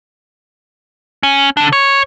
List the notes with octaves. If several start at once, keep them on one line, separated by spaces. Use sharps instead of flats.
C#4
D3 D4
C#5